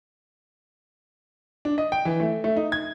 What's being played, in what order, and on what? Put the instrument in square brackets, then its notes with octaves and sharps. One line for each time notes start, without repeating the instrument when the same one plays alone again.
[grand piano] D4
D#5
G5
E3
A3
A3
D#4
G#6